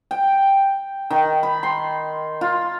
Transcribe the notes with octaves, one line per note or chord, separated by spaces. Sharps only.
G5
D#3
B5
C6
F4